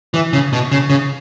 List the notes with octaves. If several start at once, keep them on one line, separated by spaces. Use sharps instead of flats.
E3
C#3
B2
C#3
C#3